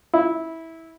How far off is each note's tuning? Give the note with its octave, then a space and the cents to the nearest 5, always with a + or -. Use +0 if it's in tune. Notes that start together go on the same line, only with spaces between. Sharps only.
E4 -15